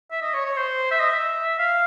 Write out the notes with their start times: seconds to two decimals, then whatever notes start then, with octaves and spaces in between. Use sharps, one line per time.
0.11 E5
0.22 D#5
0.34 C#5
0.45 C#5
0.56 C5
0.91 E5
1.00 D#5
1.10 E5
1.59 F5